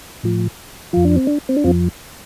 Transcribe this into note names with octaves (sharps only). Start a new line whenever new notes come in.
A2 F3
F2 F3 F4
D4
C4
D4
C4
D4
F2 F3 C4 F4